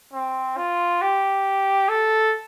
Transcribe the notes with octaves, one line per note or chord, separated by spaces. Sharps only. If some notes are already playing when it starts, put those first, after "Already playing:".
C4
F4
G4
A4